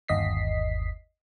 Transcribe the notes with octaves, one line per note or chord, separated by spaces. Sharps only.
G1 D#2 D#5 B6 C7